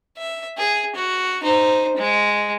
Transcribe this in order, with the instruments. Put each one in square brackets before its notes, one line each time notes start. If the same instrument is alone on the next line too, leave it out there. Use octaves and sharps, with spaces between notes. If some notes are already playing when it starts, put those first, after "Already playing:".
[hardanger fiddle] E5
G#4
F#4
D#4 C5
G#3